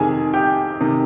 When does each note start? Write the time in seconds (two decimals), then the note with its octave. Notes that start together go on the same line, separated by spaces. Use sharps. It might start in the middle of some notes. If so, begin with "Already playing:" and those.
Already playing: F2 C3 D#3 G#4 G#5
0.34 G4 G5
0.81 C3 D#3